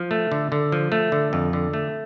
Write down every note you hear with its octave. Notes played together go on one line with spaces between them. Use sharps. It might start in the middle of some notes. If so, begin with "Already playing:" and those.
Already playing: F3
A3
D3
D3
F3
A3
D3
F2
D3
A3